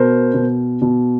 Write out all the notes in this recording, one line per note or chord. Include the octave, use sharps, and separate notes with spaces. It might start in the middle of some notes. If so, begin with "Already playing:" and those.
Already playing: B2 A#4 C5
B2
B2